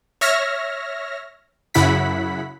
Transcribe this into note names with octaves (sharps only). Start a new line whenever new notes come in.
C#5 E5 F6 A#6
F#2 C#3 E4 F#5 B5 B6